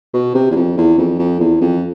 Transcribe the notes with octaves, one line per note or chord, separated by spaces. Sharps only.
B2
C3
E2
F2
E2
F2
F2
E2
F2